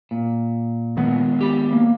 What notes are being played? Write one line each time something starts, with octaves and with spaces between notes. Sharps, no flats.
A#2
D#3 G#3 B3
G4 B5
A#3